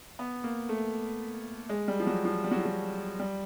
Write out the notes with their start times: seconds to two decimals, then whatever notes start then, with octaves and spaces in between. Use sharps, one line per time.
0.19 B3
0.44 A#3
0.69 A3
1.69 G#3
1.88 G3
2.00 F3
2.07 F#3
2.25 F3
2.44 G3
2.51 F#3
2.59 F3
2.65 F#3
3.19 G3